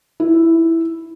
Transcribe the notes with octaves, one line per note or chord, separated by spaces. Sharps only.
E4